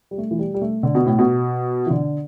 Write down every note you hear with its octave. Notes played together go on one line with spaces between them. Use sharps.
G3
A3
E3
G3
G3
A3
D3
B2
A2
B2
E3
D3